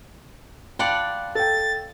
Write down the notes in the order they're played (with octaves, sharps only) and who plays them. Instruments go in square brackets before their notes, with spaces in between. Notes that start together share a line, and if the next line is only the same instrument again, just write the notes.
[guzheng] F4 D5 F#5 [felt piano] G5 A5 B5
[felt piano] A4 G5 [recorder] A6